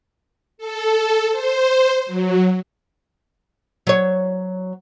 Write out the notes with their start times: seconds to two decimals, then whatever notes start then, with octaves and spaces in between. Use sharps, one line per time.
0.58 A4
1.30 C5
2.06 F#3
3.87 F#3 C#5